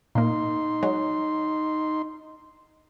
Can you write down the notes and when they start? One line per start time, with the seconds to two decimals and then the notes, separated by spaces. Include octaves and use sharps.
0.15 A#2 A#3 D#4 C6
0.83 F#3 G#3